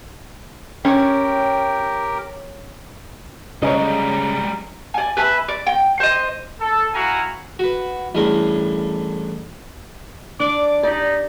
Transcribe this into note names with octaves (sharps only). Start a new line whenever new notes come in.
C#4 G4 A#4 C#5 G5
C#3 G3 G#3 C#5 D#5 A#5
D5 G#5
B4 E5 G#5 B5
D5
G5
C5 D#5
A4
E4 F#4 F5 G#5 A#5
F#4 B4
A1 G2 G#4 A#4
D4 D5 D6
D#4 G4 D5